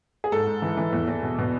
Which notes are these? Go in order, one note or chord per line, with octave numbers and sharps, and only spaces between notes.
G#4
G#2 A4
G#2
E3
E3
E2
E2
B2
B2